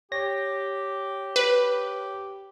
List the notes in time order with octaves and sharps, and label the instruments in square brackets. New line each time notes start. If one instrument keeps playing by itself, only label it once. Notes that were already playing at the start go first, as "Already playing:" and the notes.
[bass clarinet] G4 [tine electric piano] C#5 A#6
[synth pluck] B4